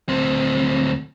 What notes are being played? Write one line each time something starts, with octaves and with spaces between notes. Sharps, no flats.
D2 C4